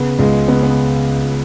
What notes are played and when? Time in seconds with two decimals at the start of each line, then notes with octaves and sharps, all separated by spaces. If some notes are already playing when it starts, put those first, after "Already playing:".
Already playing: C#3 B3
0.19 C#2 G#3
0.48 C#3 B3
0.63 B3